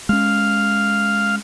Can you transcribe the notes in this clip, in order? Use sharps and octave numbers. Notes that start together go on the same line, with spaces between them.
G#3 C#4 F5